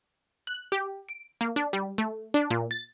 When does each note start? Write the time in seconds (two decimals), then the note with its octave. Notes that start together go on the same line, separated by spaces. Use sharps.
0.47 F#6
0.72 G4
1.09 D7
1.41 A#3
1.56 D4
1.73 G3
1.98 A3
2.34 D4
2.51 A#2
2.71 A6